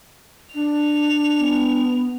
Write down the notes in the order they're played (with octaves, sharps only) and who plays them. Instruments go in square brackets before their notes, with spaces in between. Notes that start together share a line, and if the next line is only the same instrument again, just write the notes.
[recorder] D4 [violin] F7
[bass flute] B3